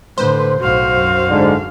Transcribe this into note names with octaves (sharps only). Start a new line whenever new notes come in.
A2 D3 B4 C5
B1 A2 F#4 F5
F#2
G#2 D3